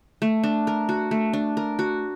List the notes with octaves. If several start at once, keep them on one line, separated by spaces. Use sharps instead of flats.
A3
D4
A#4
F#4
A3
D4
A#4
F#4